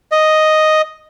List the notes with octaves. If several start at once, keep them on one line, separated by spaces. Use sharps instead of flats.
D#5